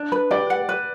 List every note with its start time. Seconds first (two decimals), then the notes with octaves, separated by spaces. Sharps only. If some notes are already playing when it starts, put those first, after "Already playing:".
Already playing: D4
0.12 B4
0.31 G4 D5
0.50 F#5
0.69 B4